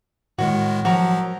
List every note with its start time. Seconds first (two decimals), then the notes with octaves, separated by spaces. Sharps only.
0.38 A2 D#3 G#3 F#4
0.85 F3 F#3 F#4 A#4